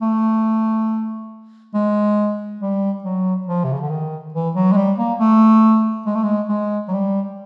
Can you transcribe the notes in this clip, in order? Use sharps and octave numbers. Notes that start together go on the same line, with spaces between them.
A3
G#3
G3
F#3
F3
C3
C#3
D3
D#3
E3
F#3
G#3
G3
A#3
A3
G#3
A3
G#3
G#3
F#3
G3